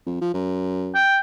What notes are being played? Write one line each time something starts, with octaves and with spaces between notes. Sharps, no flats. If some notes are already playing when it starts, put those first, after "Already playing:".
F2
F3
F#2
G5